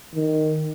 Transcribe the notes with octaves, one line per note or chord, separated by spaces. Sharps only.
D#3